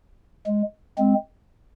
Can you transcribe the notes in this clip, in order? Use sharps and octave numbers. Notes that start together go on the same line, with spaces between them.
G#3
G#3 C4